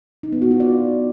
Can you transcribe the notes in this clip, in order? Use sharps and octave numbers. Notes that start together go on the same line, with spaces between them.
D#4
B3
F#4
F4
D5